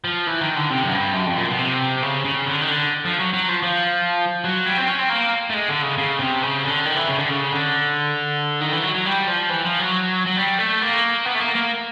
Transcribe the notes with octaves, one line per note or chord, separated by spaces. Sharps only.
F3
E3
D#3
D3
C3
F#2
G2
F#2
F2
A#2
B2
C3
C#3
C#3
D3
D#3
D3
F3
F#3
F#3
F3
F3
F#3
G3
C4
C#4
C4
A#3
A3
G#3
D3
C#3
C#3
C3
C#3
D3
D#3
E3
C#3
D3
C#3
D3
D#3
E3
F#3
F#3
G3
F3
E3
F3
F#3
F#3
G3
A3
A#3
B3
A3
A#3
A#3